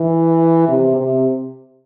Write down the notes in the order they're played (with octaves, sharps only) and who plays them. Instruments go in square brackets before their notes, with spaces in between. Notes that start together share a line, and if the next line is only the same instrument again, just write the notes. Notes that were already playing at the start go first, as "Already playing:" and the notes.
Already playing: [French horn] E3
C3
C3